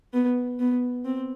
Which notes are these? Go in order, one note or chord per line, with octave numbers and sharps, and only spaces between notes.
B3
B3
C4